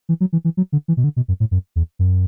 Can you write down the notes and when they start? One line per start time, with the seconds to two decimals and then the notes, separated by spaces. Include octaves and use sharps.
0.09 E3
0.20 F#3
0.33 E3
0.44 E3
0.57 F#3
0.72 D3
0.88 E3
0.97 B2
1.04 D3
1.16 B2
1.28 F#2
1.40 A2
1.51 F#2
1.76 E2
1.99 F#2